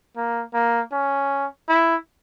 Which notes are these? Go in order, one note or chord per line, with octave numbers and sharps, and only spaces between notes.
A#3
A#3
C#4
E4